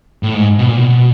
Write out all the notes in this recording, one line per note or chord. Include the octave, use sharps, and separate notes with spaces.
A2
G#2
B2
A#2
B2